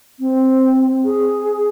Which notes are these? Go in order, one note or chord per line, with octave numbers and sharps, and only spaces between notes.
C4
G#4